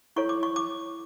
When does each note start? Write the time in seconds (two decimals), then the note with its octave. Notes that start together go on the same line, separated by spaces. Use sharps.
0.16 E4 A4 C#5 C#6
0.29 D6
0.43 C#6
0.56 D6